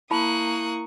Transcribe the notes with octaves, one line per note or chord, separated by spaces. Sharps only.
A#3 E4 A5 B5 C#6 D#6 F#6